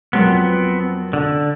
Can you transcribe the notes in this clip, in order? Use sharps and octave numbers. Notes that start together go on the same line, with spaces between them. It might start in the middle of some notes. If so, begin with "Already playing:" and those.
F2 F#3 B3 C4 A#4
D3